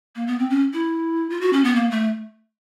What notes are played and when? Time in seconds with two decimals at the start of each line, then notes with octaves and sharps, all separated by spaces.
0.16 A#3
0.27 B3
0.39 C4
0.50 C#4
0.73 E4
1.30 F4
1.41 F#4
1.53 C#4
1.64 B3
1.76 A#3
1.91 A3